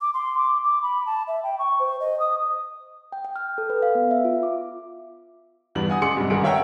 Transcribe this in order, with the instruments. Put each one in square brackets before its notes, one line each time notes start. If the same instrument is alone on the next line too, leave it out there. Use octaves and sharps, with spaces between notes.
[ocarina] D6
C6
D6
D6
B5
A5
E5
G5
C#6
C5
D#5
D#6
[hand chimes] G5
G5
F6
A4
B4
F5
B3
E5
F4
D6
[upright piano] E2 G2 B3 F#7
F#5 G#5 D#6
C#3 G#3 C6 D6 C#7 F#7
B1 G2 C3
G#2 D#3 G3 G#4 F#5 D7
A#4 C#5 E5 F#5 G5 A#5